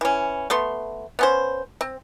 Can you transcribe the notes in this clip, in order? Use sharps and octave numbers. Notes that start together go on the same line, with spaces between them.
E3 C#4
A3 B3 C6
B3 C#4 C5
C4